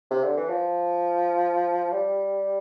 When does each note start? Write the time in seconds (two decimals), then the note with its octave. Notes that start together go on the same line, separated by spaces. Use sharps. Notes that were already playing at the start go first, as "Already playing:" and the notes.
0.11 C3
0.24 D3
0.37 E3
0.49 F3
1.92 G3